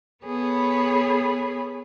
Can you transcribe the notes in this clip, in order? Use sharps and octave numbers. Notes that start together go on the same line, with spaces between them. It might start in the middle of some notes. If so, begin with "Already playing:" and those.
B3 G#4 A4 C#5 B5